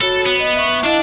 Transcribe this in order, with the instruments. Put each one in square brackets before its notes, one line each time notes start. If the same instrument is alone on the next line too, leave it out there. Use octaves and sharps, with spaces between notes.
[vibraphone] F#4 C#5 B5 [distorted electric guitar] A4
[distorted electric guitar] B3
[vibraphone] D#5
E5 C#6
[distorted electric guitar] D4 A5 [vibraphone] E4 D#5 F5